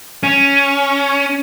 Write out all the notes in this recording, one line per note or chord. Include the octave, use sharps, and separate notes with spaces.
C#4